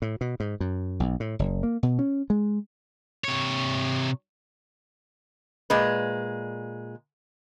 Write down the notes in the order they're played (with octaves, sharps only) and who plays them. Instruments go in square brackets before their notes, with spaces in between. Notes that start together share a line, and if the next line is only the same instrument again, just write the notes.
[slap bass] A2
B2
G#2
F#2
B1
A2
F#1
A#3
B2
C#4
G#3
[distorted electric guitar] C3 C#5
[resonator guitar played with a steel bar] A#2 G#3 B4